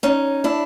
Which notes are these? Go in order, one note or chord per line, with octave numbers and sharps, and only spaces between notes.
C#4 D#4
D4 E4